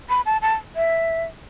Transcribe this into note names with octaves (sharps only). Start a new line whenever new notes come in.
B5
A5
A5
E5